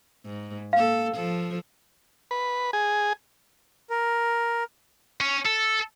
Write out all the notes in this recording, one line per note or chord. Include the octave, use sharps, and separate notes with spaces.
G#2
A#3 A4 F5
F3 A4
B4
G#4
A#4
C#4
A4